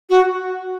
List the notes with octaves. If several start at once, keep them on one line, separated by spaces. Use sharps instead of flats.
F#4